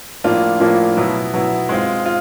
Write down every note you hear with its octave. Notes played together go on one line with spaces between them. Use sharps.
A2 F3 A#3 D4 F4
A2 F3 A#3 D4 F4
B2 F#3 B3 E4
B2 F#3 B3 E4
G#3 C4 F4
F4